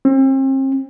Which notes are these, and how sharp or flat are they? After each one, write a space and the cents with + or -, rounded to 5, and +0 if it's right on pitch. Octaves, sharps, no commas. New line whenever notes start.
C4 +40